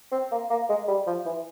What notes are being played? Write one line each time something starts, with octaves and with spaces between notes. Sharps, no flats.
C4
A#3
A#3
G#3
G3
F3
E3